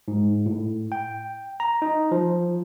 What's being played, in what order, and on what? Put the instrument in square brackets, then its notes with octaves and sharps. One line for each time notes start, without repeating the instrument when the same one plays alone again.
[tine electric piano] G#2
A2
G5
A#5
D#4
F3